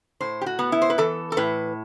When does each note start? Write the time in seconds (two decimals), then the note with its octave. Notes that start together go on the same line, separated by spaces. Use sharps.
0.20 A2 C5
0.41 G4
0.46 F#4
0.59 B3
0.72 E4
0.82 C5
0.90 B4
0.98 E3 A4
1.32 A4
1.37 A2 B4